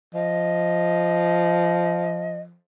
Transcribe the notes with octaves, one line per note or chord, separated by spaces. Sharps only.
F3 D#5